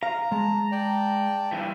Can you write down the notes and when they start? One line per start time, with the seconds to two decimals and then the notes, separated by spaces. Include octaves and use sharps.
0.03 F5 A#5
0.32 G#3 A5
0.72 D5 G5 A5
1.52 G2 E3